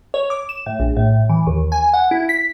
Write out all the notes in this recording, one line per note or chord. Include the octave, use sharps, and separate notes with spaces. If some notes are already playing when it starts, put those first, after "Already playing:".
C#5
D6
E7
A2
A#1
A2
E3
D#2
G#5
F#5
E4
B6